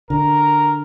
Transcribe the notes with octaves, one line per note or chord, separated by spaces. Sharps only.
D3 A#4